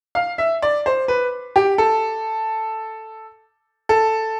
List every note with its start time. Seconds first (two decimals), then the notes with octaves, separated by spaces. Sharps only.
0.15 F5
0.38 E5
0.62 D5
0.86 C5
1.08 B4
1.56 G4
1.78 A4
3.89 A4